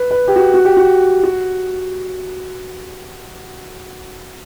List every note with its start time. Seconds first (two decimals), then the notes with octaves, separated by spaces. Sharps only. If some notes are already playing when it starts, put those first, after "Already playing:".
Already playing: B4
0.11 B4
0.28 G4
0.36 F#4
0.54 F#4
0.65 G4
0.77 F#4
1.23 F#4